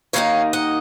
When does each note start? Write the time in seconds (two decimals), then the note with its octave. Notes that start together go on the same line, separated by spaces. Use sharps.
0.13 D#2 D#3 A#3 D#4 C#5 F5
0.53 D#5 F#5